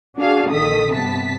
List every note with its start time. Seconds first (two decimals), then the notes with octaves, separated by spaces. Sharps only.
0.17 D4 F#4 G#4 F5 A5
0.51 A#1 D#3 A4 D#6 B6
0.93 G2 C3 B3 A5 B6